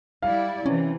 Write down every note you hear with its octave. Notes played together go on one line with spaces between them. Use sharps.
G3 E4 D5 F5
C3 E3 C#4